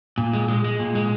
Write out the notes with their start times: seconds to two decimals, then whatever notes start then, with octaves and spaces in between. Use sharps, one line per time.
0.18 A#2
0.33 G#3
0.48 G#3
0.64 G#3
0.79 A#2
0.95 G#3